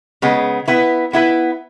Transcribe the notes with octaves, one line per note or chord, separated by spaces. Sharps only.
C#3 G#3 B3
B3 E4 B4
B3 E4 B4